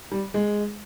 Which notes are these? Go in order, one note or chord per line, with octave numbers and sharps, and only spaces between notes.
G3
G#3